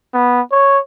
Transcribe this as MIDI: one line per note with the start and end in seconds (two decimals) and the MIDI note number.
0.14 0.41 59
0.52 0.79 73